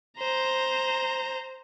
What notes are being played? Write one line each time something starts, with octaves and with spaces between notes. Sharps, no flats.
C5 A#5